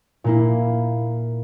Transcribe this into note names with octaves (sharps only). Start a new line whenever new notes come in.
A#2 A#3 E4